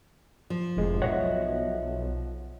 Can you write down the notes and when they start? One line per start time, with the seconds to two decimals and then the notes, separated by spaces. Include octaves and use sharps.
0.50 F3
0.77 F1 F2 A2 G#3
1.02 B1 C#5 D#5 E5 F#5